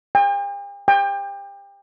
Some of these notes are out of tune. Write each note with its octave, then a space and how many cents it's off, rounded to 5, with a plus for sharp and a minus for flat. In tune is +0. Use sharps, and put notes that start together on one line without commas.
G5 +45
G5 +30